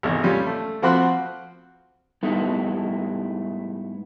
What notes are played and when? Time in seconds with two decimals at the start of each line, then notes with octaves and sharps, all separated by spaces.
0.03 G#1 E2
0.23 G3 C#4 F4
0.46 A3
0.82 F3 C4 F#4 B5 C6 F#6
2.23 G#2 G3 A3 B3 D#4 E4